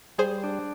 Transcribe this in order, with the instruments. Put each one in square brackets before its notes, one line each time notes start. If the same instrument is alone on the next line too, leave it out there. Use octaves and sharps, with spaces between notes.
[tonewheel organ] G3 [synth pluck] G#4 C5
[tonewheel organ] D4